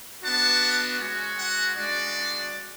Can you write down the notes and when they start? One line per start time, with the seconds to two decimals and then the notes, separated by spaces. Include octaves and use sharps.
0.23 B3 D4 F#4 A5
0.99 G#3 C#4 F#4
1.36 F#5
1.74 G#3 D4 F#4 D5